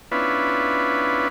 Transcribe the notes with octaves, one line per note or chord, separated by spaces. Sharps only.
B3 C#4 D4 E4 F4 B4